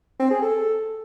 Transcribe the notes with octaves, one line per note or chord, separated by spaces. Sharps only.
C4
G#4
A4